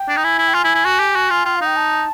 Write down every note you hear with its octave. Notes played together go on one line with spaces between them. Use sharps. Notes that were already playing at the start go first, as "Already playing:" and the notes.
Already playing: G5
D4
D#4
E4 G#5
E4
G5
F4 G#5
E4
E4
F#4
G4
F#4
F4
F4 G5
F5
D#4 G5
A5